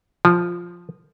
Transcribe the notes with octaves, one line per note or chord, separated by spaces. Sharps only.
F3